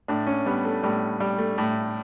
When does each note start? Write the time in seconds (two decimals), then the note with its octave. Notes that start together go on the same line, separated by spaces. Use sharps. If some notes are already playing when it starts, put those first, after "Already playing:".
0.08 A2 D4
0.27 C#4
0.46 G3 B3
0.65 A3
0.83 A2 G3
1.20 G3
1.38 A3
1.58 A2